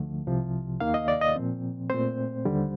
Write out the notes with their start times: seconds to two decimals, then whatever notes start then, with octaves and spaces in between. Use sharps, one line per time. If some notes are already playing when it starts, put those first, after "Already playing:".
Already playing: D2 D3 F3 A3
0.27 C2 C3 F3
0.80 D#2 D#3 A#3 F5
0.94 D#5
1.08 D5
1.21 D#5
1.36 A#2 F3 C4
1.90 A#2 A3 C4 C5
2.45 D#2 D3 G3